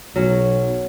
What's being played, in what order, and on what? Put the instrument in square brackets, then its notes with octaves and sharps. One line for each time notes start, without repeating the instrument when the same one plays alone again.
[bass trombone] B1 [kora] F#3 C#4